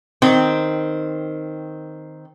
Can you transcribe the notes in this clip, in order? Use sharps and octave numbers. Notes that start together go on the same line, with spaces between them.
D#3 C4